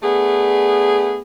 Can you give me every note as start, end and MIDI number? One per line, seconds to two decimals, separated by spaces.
0.03 1.20 57
0.03 1.20 59
0.03 1.20 62
0.03 1.20 68